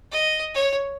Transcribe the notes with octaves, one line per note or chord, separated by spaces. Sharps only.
D#5
C#5